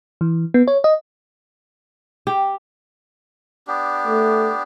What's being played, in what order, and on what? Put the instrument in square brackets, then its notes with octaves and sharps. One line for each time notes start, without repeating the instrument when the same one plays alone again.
[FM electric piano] E3
B3
C#5
D#5
[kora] G4
[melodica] B3 D4 G4
[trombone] A3